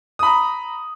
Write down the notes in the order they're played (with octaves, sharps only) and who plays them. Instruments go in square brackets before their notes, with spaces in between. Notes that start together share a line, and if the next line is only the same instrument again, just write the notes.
[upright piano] D#6
B5
A#5